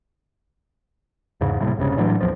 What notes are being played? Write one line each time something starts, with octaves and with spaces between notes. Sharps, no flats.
E2 G#2 C#3
D#2 A2 C3 G3
E1 C2 G2 C#3
A2 E3 F#3 D4
B1 E2 F3